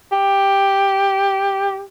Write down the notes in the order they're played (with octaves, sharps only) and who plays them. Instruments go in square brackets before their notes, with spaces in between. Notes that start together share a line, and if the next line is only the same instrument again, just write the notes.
[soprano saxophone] G4